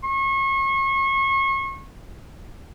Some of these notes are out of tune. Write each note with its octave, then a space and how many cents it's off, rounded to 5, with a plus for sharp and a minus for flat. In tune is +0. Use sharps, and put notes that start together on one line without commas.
C#6 -35